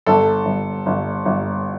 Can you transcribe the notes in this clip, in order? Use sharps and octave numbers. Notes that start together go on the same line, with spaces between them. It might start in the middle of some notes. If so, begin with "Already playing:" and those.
G1 A4
G1
G1
G1